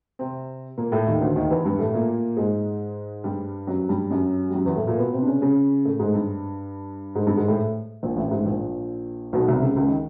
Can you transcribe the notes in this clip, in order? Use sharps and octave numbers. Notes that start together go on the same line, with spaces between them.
C3 C4
A#2 A#3
A2 A3
D#2 D#3
D2 D3
D#2 D#3
E2 E3
G2 G3
A2 A3
A#2 A#3
G#2 G#3
G2 G3
F#2 F#3
G2 G3
F#2 F#3
G3
F#2 F#3
E2 E3
A2 A3
A#2 A#3
B2 B3
C3 C4
D4
C#3 C#4
C#3 C#4
A2 A3
G#2 G#3
G2 G3
G#2 G#3
G2 G3
G#2 G#3
A2 A3
A#1 A#2
A1 A2
G#2
A#1 A#2
B1 B2
C2 C3
C#2 C#3
C#2 C#3
D#3